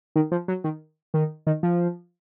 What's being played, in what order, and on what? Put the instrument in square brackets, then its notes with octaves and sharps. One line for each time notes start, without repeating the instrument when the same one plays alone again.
[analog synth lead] D#3
F3
F#3
D#3
D#3
D#3
F3